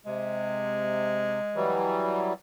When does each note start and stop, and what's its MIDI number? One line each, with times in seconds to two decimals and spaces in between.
0.06 1.40 48
0.06 2.04 56
1.55 2.33 52
1.55 2.33 54
1.55 2.33 55